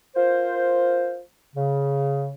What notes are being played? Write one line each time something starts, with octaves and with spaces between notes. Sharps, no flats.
F4 A#4 C5
C#3